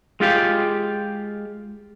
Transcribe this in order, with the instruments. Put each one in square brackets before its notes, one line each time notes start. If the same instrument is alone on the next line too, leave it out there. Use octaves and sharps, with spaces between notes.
[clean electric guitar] G#3 F4 G4 F5